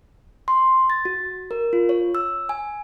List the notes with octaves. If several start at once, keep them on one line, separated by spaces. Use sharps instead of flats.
C6
A6
F#4
A#4
F4
C#5
E6
G#5